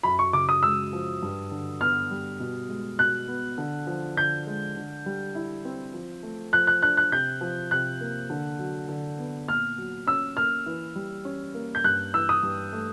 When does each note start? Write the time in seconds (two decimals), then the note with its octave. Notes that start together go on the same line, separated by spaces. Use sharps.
0.03 F#2 B5
0.19 C#6
0.33 C#3 D6
0.49 D#6
0.63 G#3 E6
0.93 F3
1.22 G2
1.51 D3
1.80 B3 F6
2.11 G3
2.40 B2
2.69 G#3
2.99 B2 F#6
3.28 B3
3.58 D3
3.87 F3
4.16 D3 G6
4.47 G#3
4.76 D3
5.06 G3
5.35 E4
5.65 C4
5.94 F3
6.23 A3
6.53 F3 F#6
6.67 F#6
6.82 D4 F#6
6.97 F#6
7.12 C3 G6
7.41 F3
7.71 C3 F#6
8.01 A#3
8.30 D3
8.59 F#3
8.89 D3
9.19 B3
9.48 A#2 F6
9.78 F#3
10.07 C#4 E6
10.37 A#3 F6
10.66 E3
10.96 G3
11.25 C#4
11.54 A#3
11.75 G6
11.84 G2 F#6
12.14 E3 E6
12.29 D#6
12.43 G2
12.73 A3